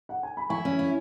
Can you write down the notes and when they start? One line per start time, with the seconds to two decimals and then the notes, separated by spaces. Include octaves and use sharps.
0.09 F#5
0.23 G#5
0.37 B5
0.49 E4 G#5 C#6
0.65 C#4
0.79 E4